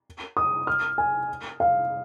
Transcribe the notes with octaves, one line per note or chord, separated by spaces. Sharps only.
D#6
F6
G#5
F5